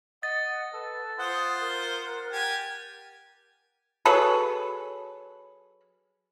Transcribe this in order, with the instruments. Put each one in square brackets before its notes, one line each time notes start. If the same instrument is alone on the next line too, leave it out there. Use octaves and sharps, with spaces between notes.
[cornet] D#5 [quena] F#5 [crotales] A6
[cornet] A4 [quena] B4
[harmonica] F4 C5 [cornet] F#5 [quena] D#6
[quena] A#4 [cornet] F#5
[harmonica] G4 G#5
[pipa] F#3 G#4 A4 B4